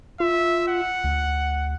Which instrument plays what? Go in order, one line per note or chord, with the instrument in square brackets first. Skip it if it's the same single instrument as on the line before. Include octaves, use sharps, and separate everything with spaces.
[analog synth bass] F4 [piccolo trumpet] E5
[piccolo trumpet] F#5
[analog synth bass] D2